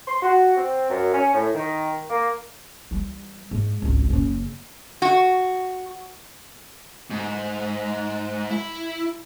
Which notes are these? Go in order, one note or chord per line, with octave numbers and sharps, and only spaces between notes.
C6
F#4
C4
F#2
C#4
A2
D#3
A#3
E3 G3
G#2
G#1 C#2
F#1 C#3
F#4
G#2
E4